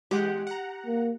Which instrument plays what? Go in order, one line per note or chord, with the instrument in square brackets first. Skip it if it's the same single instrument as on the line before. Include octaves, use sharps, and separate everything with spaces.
[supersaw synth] E2 G#3 F#5 [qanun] G4
[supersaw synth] F#5 A#5
[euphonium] A#3